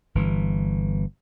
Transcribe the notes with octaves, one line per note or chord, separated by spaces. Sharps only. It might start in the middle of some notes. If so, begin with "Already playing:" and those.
G1 E3